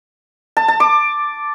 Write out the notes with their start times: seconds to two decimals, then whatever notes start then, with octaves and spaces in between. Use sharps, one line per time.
0.57 A5
0.68 A5
0.80 D6